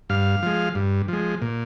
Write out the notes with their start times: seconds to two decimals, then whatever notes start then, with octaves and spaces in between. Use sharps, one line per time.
0.10 G2 F5
0.43 F3 G#3
0.75 G2
1.08 F3 G#3
1.42 A#2